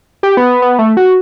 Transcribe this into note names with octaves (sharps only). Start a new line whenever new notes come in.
G4
B3
B3
A3
F#4